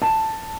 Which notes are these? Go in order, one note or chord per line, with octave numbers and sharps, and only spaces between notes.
A5